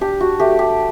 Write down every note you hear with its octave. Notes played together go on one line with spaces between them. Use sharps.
D4 G4
F#4
A3 G4
G4